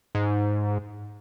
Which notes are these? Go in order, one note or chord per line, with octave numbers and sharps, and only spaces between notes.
G#2